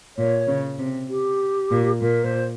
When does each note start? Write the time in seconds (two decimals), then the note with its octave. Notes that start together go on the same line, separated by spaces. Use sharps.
0.17 A#2 C#5
0.47 C#3
0.78 C3
1.09 G4
1.71 A#2
2.01 A#2 A#4
2.24 C5